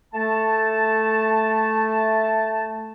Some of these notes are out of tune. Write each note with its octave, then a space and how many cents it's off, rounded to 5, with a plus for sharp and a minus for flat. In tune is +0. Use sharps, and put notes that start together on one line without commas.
A3 +0 A5 +0